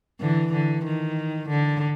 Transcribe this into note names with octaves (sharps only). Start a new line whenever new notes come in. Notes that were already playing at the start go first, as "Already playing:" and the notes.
D3 E3
D3
D#3
D3